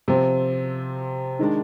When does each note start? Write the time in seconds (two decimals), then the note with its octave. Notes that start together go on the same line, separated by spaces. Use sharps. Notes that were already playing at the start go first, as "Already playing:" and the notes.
0.08 C3 F3 C4
1.39 D#3 G#3 D4